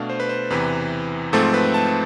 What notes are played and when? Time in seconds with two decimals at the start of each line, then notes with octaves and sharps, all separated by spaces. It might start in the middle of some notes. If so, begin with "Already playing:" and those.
Already playing: B2 A3 D4 F5
0.10 C5
0.20 B4
0.29 C5
0.50 E2 C3 E3 B4
1.33 G#2 F3 A3 C4 A4
1.54 B4
1.74 A5